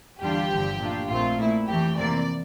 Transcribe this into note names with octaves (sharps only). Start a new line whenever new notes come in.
E2 D3 G3 D4 F4 G4
G1 G2 D3 F3
A#2 A3 D4 F4
A#1 A#2 A3 C4 F4
A#2 A3 E4
F2 E3 A3 G4
F2 C3 E3 A#3 D5